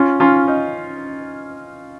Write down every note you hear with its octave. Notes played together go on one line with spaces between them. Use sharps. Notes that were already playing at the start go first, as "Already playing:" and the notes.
Already playing: C#4 F4
C#4 F4
D#4